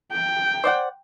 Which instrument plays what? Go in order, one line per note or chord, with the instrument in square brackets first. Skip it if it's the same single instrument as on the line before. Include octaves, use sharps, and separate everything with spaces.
[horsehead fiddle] G5
[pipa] C5 D5 F#5